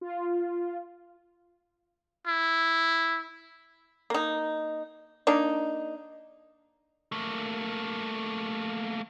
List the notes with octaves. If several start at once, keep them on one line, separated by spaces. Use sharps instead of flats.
F4
E4
A#3 D#4
A#3 D4 D#4
A3 A#3